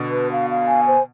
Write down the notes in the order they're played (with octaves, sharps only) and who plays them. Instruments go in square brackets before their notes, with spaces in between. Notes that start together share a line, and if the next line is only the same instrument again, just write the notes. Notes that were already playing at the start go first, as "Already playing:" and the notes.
Already playing: [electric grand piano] B2 D3
[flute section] B4
F5
F5
G#5
C5